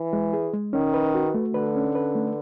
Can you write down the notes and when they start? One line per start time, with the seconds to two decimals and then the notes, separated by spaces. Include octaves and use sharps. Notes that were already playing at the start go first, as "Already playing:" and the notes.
Already playing: E3
0.13 G#3
0.33 G#4
0.53 G#3
0.73 D#3 C#4
0.94 B4
1.15 F#4
1.34 A3
1.54 D3 B4
1.76 C#4
1.95 B4
2.15 A3